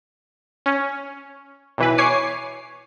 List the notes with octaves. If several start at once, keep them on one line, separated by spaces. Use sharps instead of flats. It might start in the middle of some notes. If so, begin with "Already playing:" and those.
C#4
B1 E3 B4
C#5 G#5 D6 C7